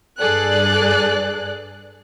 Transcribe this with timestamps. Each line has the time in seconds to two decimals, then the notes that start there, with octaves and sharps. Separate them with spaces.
0.19 G2 G#4 A4 D5 F#6